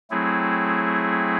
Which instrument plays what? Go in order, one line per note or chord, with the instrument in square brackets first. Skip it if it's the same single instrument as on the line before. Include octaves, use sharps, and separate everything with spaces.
[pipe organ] F#3 A3 C4 E4 G#4